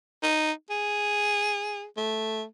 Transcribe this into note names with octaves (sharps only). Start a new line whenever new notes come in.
D#4
G#4
A3